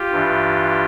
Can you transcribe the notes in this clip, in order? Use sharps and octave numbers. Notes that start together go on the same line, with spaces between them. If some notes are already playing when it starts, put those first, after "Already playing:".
Already playing: F4 G4
G2 E3